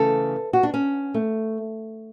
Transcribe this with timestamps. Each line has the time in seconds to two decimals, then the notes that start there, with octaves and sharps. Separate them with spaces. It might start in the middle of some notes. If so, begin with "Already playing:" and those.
Already playing: C#3 E3 A3 A4
0.53 F#4
0.63 D4
0.74 C#4
1.14 A3